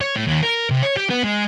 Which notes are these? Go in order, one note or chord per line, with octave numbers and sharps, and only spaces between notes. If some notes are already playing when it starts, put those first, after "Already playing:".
C#5
A2
D#2
A#4
C3
C#5
G4
B3
G#3